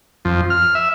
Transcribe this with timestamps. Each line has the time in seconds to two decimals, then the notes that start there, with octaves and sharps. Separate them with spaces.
0.25 F2
0.50 F6
0.75 E5